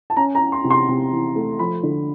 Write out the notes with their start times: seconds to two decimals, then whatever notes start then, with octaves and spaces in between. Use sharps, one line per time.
0.10 A5
0.17 C#4 A#5
0.35 A#5
0.40 C#4
0.52 C6
0.64 C3
0.70 C6
0.88 C3
1.12 E3
1.36 A3
1.59 F3 B5
1.83 D3